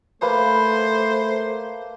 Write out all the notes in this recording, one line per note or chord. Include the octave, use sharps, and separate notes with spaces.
A3 A#3 B4 C5 A5